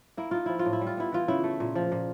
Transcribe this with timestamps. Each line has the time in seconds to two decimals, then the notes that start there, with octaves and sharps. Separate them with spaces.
0.17 A#3 E4
0.31 D#4 F4
0.46 F3 E4
0.59 F4
0.65 A2
0.73 E4
0.81 G3
0.87 F4
0.97 B3 E4
1.12 E3 F4
1.28 C#3 E4
1.43 A3
1.60 A#2
1.75 F3
1.92 A#2